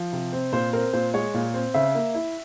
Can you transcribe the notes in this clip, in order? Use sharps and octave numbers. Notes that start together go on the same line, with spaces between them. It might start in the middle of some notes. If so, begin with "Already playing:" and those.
Already playing: F3
C3
C4
A#2 C5
C4 A#4
A#2 C5
G#3 C#5
A#2
C4
C#3 E5
A#3
E4